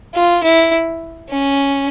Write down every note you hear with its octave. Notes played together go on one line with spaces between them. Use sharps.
F4
E4
C#4